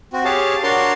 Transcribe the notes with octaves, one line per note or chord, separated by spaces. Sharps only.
C4 F#4
G4 G#4 C#5 F5 A5
D4 F#4 A#4 C#5 A5 C6